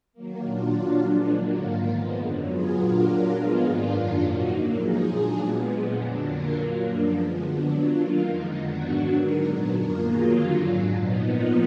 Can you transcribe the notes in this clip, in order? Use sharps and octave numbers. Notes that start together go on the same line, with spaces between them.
D#3 F#3 A#3
A#2 F#3 D4 F4
F#3 D4 F4
A#2 F3 G#3 D4
D3 F#3 A#3
G#2 D#3 A#3 F4
F3 G#3 B3
F#2 D3 F#3
F#3 B3 F4 G#4
A#2 F#3 D4 F4 A#4
F#3 D4 F4 A#4
F3 G#3 B3 F4 G#4
G#2 D#3 A#3 D4 F4
F#2 D#3 F#3 D4 F4
A#2 F3 A#3 D#4 F#4
D3 F#3 A#3
F3 G#3 D#4 G#4
A#2 F#3 D4 F4 G#4
A#2 G#3 B3
A#2 F3 G#3 B3
F2 D3 F#3 D4
D3 F#3 A#3 F4 A#4
A#2 F#3 A#3
F#2 D3 F3 A#3 D4
F3 G#3 B3
D3 F#3 B3 D4
F#3 D4 F4
D#3 A#3 F4 A#4
F2 D3 F3 G#3 D#4
D#3 F#3 B3 D4 F#4
G#2 F#3 D4 F#4
D3 G#3 D#4 A#4
A#2 F#3 B3 D4
F#2 F3 A#3 F4 A#4
D#3 F#3 A#3 F4 G#4
F2 D3 F#3 A#3 F4
G#2 F#3 D4
A#2 F3 B3 D#4